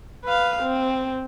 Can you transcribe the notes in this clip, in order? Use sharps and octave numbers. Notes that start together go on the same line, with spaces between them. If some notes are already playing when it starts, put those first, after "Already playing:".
B4 F5
C4